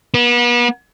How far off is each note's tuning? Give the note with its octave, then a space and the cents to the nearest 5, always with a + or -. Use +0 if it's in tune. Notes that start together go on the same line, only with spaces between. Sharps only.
B3 -40